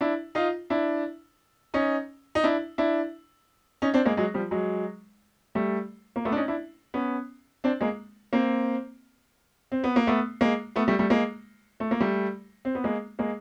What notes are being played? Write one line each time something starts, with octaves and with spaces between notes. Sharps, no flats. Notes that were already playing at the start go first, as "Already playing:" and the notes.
D4 E4
D#4 F4
D4 E4
C#4 D#4
D#4
D4 E4
D4 E4
C#4 D#4
C4 D4
G#3 A#3
F#3 G#3
F3 G3
F#3 G#3
G3 A3
A#3
A3 B3
D4
C#4 D#4
D4 E4
B3 C#4
C4 D4
G#3 A#3
A#3 C4
C4
B3
A#3
A3 B3
G#3 A#3
A3 B3
G3 A3
G3 A3
G#3 A#3
A3
A#3
G3 A3
C4
B3
G#3 A#3
G#3 A#3